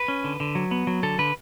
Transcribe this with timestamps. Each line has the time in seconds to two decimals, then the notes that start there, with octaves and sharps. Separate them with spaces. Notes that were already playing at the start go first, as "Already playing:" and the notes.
Already playing: B4
0.08 C#4
0.24 D3
0.40 D3
0.55 F#3
0.71 B3
0.87 F#3
1.03 D3 A4
1.19 D3 B4